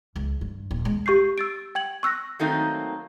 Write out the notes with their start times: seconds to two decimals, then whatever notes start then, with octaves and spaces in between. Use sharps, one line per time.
0.16 C#2
0.41 G2
0.71 D#1
0.85 G#3
1.06 G4 C#6 G6 C7
1.38 E6 A6 D7
1.75 G5 G#6 F#7
2.03 C#6 E6 F#6 A#6
2.39 D#3 F#3 A3 A#3 C4 D#4